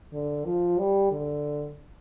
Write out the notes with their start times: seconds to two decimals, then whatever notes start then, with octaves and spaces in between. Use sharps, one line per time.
0.13 D3
0.45 F3
0.78 G3
1.11 D3